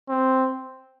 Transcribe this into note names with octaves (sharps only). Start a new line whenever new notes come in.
C4